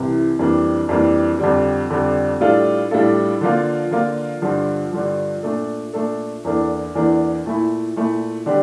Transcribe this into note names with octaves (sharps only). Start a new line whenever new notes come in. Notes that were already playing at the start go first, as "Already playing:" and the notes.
Already playing: C2 C3 E3
F2 E3 G3 A#3 D4
F2 E3 G3 A#3 D4
F2 D3 G3
F2 D3 G3
A2 G3 D4 F4 A4
A2 G3 D4 F4 A4
D3 F3 A#3 F4
D3 F3 A#3 F4
G2 D3 F3
G2 D3 F3
A#2 A3 D4 A4
A#2 A3 D4 A4
E2 E3 A#3 D4 A4
E2 E3 A#3 D4 A4
A#2 A3 E4
A#2 A3 E4
D3 G3 D4 G4